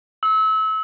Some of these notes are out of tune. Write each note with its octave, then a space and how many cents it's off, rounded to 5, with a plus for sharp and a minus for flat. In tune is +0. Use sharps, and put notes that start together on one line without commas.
E6 -30